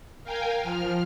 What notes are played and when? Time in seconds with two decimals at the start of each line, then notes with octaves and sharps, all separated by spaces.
0.24 A#4 F5 G5 G#5
0.62 F3 F6